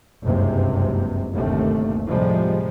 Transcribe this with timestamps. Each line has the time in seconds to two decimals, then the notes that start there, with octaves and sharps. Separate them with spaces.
0.24 F#1 C#2 G2 C3
1.32 G1 D#2 C3 A3
2.08 A2 C3 F3 G3 G#3